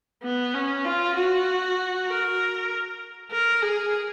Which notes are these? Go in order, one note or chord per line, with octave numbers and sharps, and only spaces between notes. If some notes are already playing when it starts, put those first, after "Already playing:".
B3
C#4
F4
F#4
A#4
A#4
G#4